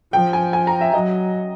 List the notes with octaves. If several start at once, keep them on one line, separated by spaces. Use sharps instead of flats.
F3 G5
G#5
G#5
A#5
E5
F#3 D#5